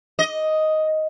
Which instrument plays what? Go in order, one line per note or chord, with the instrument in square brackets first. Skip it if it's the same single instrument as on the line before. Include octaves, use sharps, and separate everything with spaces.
[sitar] D#5